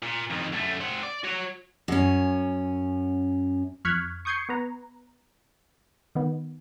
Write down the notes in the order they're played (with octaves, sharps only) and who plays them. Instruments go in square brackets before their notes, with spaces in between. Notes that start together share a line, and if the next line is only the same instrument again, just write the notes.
[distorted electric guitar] A#2
F2 D#3
F#2 A3
C4 F#5
D5
F#4 C#5
[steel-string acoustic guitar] F#2 C#4
[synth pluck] F2 C#6 F6 F#6 G#6 B6
C#6 D#6 G6 G#6 C7 C#7
B3 B4 A#5
D#3 B3